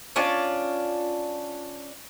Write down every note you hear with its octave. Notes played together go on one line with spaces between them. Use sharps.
C#4 D4 F4 D5